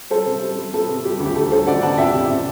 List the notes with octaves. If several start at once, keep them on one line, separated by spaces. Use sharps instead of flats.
G3 A4 C5
C3
G3
G3
B3 A4
C3
G3 G4
D2
G4
D2 A4
G3 A4 C5
D2 D5 F#5
B3 F#5 A5
C3 E5 G5
C3
C3